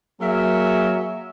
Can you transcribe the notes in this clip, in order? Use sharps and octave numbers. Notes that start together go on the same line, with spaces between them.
F#3 A#3 G#4 A#4 C#5 E5